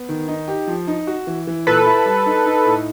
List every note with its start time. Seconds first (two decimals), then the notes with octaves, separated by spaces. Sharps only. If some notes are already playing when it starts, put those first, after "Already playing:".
Already playing: B3
0.09 D#3
0.28 D#4
0.48 G4
0.67 F3
0.87 D#4
1.07 F#4
1.27 E3
1.47 E3
1.67 A#2 A4 B4
1.86 E4
2.06 G3
2.26 D#4
2.46 D#4
2.66 A2